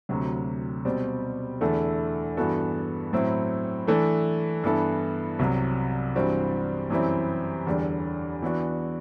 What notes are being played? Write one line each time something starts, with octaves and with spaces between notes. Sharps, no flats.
D2 C3 F#3
B2 G3 C4
E2 D3 A3 E4 A4
G2 E3 B3 F#4 A4
A2 F#3 C4 E4
E3 A3 D4 A4
G2 E3 B3 E4 A4
C2 C3 F#3
G2 E3 G3 C4 F#4
F#2 E3 G3 C4 E4
E2 D3 G3
E3 B3 D4 F#4